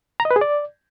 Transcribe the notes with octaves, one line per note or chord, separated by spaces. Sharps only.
A#5
D#5
B4
G#4
D5